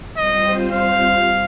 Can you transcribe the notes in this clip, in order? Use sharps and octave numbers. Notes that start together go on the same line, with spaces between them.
G3 C4 F4 C5 D#5
F5